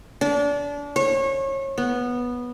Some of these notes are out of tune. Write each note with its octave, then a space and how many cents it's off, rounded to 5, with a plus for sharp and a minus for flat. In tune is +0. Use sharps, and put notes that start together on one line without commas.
D4 -30
C#5 -30
B3 -10